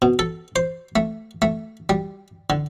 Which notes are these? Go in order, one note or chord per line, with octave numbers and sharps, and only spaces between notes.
B2
A4
C5
A3
A3
G3
D3